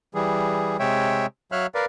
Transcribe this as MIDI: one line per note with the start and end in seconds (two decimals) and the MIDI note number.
0.15 0.77 52
0.15 0.77 55
0.15 0.77 68
0.79 1.26 48
0.79 1.26 56
0.79 1.26 73
0.79 1.26 76
0.79 1.26 79
1.52 1.66 54
1.52 1.66 73
1.52 1.66 76
1.52 1.66 77
1.52 1.66 89
1.52 1.66 90
1.75 1.86 70
1.75 1.86 71
1.75 1.86 74
1.75 1.86 77